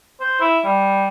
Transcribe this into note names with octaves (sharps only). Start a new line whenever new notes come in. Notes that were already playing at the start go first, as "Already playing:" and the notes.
C5
E4
G3